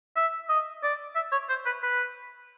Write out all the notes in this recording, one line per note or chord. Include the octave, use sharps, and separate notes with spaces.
E5
D#5
D5
E5
C#5
C5
B4
B4